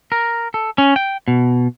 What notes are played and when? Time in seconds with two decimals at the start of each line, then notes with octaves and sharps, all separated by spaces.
0.12 A#4
0.54 A4
0.78 C#4
0.96 G5
1.28 B2